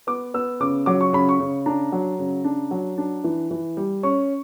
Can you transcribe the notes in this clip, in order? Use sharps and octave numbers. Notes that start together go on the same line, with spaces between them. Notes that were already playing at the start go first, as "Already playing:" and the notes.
B3 D6
B3 E6
C#3 D6
F#3 D6
C#6
C#3 B5
C#6
C#3
D4 A#5
F#3
C#3
D4
F#3
D4
E3
E3
G3
C#4 C#6